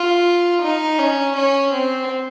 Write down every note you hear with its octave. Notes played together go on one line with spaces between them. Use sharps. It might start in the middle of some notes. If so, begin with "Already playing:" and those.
Already playing: F4
D#4
C#4
C#4
C4